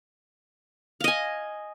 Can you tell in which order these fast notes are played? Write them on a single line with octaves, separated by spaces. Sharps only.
F5 D#5 G#5